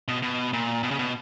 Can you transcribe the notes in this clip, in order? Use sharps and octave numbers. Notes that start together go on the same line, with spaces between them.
B2
B2
A#2
B2
C#3
B2